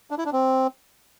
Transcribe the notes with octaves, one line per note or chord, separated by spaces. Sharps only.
D4
E4
D4
C4